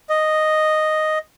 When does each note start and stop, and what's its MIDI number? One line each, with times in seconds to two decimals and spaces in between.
0.10 1.19 75